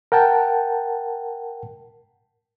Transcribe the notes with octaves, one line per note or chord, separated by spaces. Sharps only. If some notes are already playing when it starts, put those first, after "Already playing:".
A#4 F#5 G5 A5